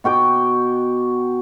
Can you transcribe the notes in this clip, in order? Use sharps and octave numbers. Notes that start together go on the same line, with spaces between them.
B2 F#4 G5 D6